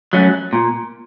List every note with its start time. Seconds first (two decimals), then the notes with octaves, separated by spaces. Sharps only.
0.13 F#3 A3 C#4
0.53 A#2